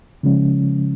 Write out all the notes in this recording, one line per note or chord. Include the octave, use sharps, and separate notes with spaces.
C#3 F3 G#3 C#4